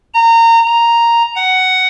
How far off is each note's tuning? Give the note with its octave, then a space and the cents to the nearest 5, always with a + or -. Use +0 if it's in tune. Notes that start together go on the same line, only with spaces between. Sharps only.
A#5 -25
A#5 +0
F#5 +10